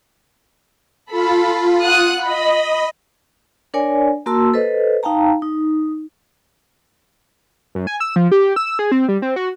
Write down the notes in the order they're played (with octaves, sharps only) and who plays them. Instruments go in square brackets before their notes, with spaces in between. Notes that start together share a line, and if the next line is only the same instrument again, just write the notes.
[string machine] F4 [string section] A4 B5
[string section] F#5 D#6 F#6
[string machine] D#5 [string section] B5
[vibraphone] D4 A#4 C#5 D5 G#5
A#3 F#4 A#4 A5 C6 E6
A4 B4 C5 D#5
D#4 F5 G5 A5 A#5
D#4
[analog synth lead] F#2
G#5
E6
F3
G4
E6
G#4
C4
G3
C4
F#4